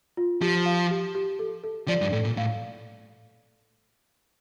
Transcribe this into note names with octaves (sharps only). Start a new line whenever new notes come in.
F4
F3 G4
F5
G4
G4
A4
A4
F3 D5
G2
A2 A4
A#2
A2 F5